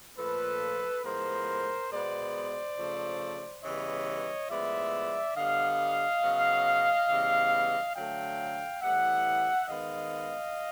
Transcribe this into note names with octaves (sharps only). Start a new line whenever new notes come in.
A#2 F3 A3 A4 B4
A2 F3 G#3 B3 A#4 C5
B2 G#3 B3 C5 D5
C#3 F3 A3
C#3 E3 G3 B3 C#5 D#5
A2 F3 G#3 B3 D5 E5
D3 G3 B3 D#5 F5
C#3 F#3 B3
C#3 E3 G3 B3
D3 F#3 A3 F5 G5
A2 E3 G3 B3 E5 F#5
D#3 G#3 B3 D#5 F5